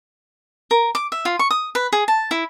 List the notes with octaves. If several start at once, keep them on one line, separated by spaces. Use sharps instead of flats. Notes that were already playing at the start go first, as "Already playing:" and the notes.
A#4
D6
E5
F4
C#6
D#6
B4
G#4
A5
E4